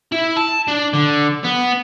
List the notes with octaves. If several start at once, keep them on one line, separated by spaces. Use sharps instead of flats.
E4
A5
D4
D3
B3